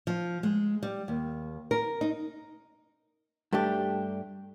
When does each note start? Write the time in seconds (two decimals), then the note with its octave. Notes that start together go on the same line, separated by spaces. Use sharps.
0.07 F3
0.43 G#3
0.83 G3
1.08 D#2
1.71 A#4
2.01 D#4
3.52 G2 A3 D4 G4